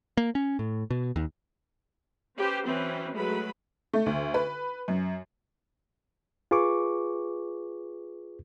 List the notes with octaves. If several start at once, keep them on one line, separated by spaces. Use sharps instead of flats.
A#3
C#4
A2
B2
D#2
C#4 G4 B4 C5
E3 F#3 C4 C#4 B4
F#3 G#3 A3 B4 B5
A3
D2
B4
F#2
F4 G#4 B4 C#6 D6